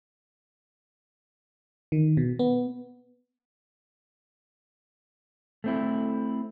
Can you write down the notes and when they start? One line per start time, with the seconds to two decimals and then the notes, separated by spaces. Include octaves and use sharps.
1.92 D#3
2.17 B2
2.39 B3
5.64 A3 C4 E4